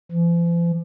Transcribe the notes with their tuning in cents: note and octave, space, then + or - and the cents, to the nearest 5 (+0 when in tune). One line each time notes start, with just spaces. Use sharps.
F3 -45